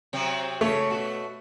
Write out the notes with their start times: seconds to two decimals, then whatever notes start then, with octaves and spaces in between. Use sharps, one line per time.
0.13 C3 F#3 C4
0.61 C#3 A3 C#5
0.90 B2 F#4